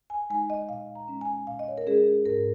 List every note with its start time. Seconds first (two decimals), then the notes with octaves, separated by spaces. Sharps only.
0.10 G#5
0.30 G#3 D#4 G#5
0.50 D#5
0.69 A#2 F5
0.95 A#5
1.08 G#3 C#4
1.21 G#5
1.47 A#2 F5
1.59 D#5
1.68 C#5
1.78 A#4
1.87 G#3 C#4 G#4
2.25 G#2 A#4